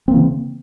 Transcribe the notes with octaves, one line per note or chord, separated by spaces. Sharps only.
C#3 E3 A#3 C4